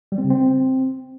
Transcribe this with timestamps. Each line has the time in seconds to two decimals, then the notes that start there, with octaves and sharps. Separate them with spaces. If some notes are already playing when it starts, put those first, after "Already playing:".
0.12 G3
0.18 C4
0.24 C#3
0.30 C4